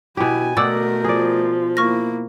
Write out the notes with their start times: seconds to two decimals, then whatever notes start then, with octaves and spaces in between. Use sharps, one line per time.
0.17 B2 E4 G4 G#5
0.57 B2 A3 A#4 D5 F#5 D6 E6 A6
1.04 F3 G#4 D5
1.77 A#3 E4 C#6 F6 A#6